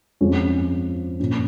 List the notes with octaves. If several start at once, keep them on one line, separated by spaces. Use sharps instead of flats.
F2 F3 G#3 C#4
A#2 F3 C#4